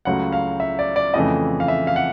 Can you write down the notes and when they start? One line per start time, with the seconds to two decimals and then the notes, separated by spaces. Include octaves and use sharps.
0.05 C#2 C#3 F#3 A3 F#5
0.32 F5
0.60 E5
0.79 D5
0.96 D5
1.14 F2 C#3 E3 A3 D#5
1.60 F5
1.68 E5
1.87 F5
1.96 F#5